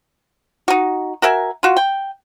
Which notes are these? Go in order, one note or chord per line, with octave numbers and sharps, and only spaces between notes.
D#4 F#4
F#4 A#4 E5 G#5
F4 F#4
G5